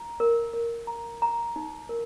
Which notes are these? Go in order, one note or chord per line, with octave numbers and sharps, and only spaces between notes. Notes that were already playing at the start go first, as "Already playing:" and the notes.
Already playing: A#5
A#4
A#4
A#5
A#5
D#4
A#4